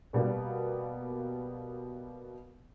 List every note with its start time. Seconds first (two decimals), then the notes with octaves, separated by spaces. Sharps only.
0.13 B2 G3 A#3 B3